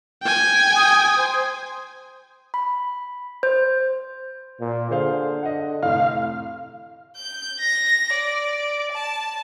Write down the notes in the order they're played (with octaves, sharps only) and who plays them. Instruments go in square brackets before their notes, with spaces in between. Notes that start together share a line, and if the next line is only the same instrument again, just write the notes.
[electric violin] G5 G#5
[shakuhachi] D#6
C5
[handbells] B5
C5
[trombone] A#2
[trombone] D3 [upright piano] G#4 C5 F5
[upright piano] D#5 F#5
[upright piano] F1 A2 [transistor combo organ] F5
[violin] G6
A#6
D5
A5